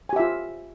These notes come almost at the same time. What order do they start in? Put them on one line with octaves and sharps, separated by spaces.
G#5 G4 E5 F4